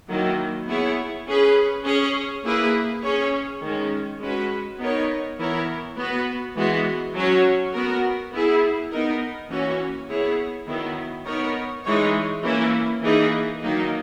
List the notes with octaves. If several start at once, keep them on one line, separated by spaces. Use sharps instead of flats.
D#3 F#3 A#3 E4
B3 E4 G#4 C#5
C#4 G#4 B4
C#4 G#4 C#5
A#3 E4 G#4 B4
C#4 G#4 C#5
D#3 G#3 C#4
G#3 C#4 F#4 B4
B3 D#4 A#4 C#5
E3 B3 E4 A#4 C#5
B3 F#4 B4
E3 G#3 B3 F#4
F#3 C#4 F#4 C#5
B3 F#4 A#4
B3 E4 G#4
B3 D#4 A#4
E3 A#3 C#4 F#4 C#5
B3 E4 G#4 C#5
D#3 F#3 B3 E4
B3 D#4 A#4 C#5
E3 G#3 D#4 G#4 C#5
E3 A#3 C#4 E4
E3 A#3 D#4 G#4
D#3 F#3 A#3 D#4